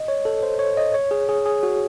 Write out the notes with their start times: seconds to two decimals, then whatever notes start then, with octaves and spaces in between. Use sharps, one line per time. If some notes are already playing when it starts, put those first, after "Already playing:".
Already playing: D#5
0.08 C#5
0.25 A4
0.43 C5
0.59 C#5
0.77 D#5
0.94 C#5
1.11 G#4
1.29 G#4
1.46 G#4
1.63 F#4